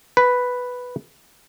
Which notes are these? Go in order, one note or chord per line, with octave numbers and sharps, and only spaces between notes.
B4